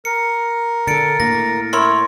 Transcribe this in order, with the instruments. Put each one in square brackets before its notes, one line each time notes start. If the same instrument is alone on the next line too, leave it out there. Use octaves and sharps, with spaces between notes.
[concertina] A#4 [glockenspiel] C#7
[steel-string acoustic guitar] D3 A4 [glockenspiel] A6 C#7 D7
[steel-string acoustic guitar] A2 A#3 [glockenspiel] A#6
[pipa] E4 A#4 C#5 [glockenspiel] C6